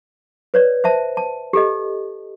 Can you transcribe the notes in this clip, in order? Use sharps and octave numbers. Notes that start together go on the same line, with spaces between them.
B4 C#5 D5
C5 E5 A5
A5
G4 A4 D#5